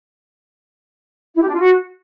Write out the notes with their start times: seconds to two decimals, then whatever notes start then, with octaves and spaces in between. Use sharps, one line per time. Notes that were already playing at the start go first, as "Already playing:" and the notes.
1.36 E4
1.42 G4
1.48 D4
1.54 F4
1.60 F#4